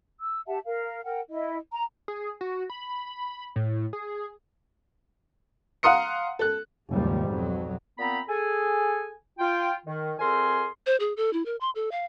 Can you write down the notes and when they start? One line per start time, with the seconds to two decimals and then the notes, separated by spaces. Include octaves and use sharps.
0.21 E6
0.48 G4 E5 F#5 A5
0.65 A#4 F5
1.04 A#4 F#5 G5
1.30 E4 D#5
1.72 A#5
2.08 G#4
2.41 F#4
2.70 B5
3.56 A2
3.93 G#4
5.83 F5 F#5 A#5 C6 D#6 C#7
6.39 A4 F#6
6.92 F#1 D#2 G#2 F3 G3
7.27 B1 F2 F#3
7.99 A#2 B3 C4 A#5 B5
8.29 G#4 A4 G#5
9.39 F4 G5
9.86 D#3
10.19 F2 C4 G#4 A#4 G#5 C6
10.86 C5
11.00 G#4
11.17 A4
11.33 E4
11.46 A#4
11.61 C6
11.75 A4
11.91 F5